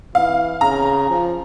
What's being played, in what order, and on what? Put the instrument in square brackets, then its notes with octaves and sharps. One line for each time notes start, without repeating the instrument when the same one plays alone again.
[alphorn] E3 [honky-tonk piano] F5
[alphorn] C#3 [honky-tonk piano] A#5
[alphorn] F3